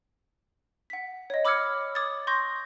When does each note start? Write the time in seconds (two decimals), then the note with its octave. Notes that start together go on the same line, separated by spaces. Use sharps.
0.90 F#5 B6
1.30 C#5 D#5
1.45 B5 D6 E6 F6 G#6 C#7
1.95 D6 D#6 G#6 A6
2.27 C6 C#6 G6 A#6